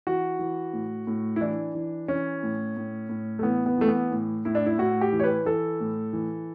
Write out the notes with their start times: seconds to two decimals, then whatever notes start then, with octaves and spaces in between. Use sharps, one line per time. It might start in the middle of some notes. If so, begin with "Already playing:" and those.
0.07 E3 F#4
0.39 E3
0.73 A2
1.07 A2
1.36 E4
1.41 E3 D4
1.75 E3
2.08 E3 C#4
2.43 A2
2.77 A2
3.09 A2
3.39 A3
3.43 E3 B3
3.66 B3
3.78 E3 A3
3.88 B3
4.11 A2
4.45 A2 E4
4.55 D4
4.66 E4
4.78 A2 F#4
5.01 G4
5.12 E3
5.20 C#5
5.24 B4
5.45 E3 A4
5.80 A2
6.13 E3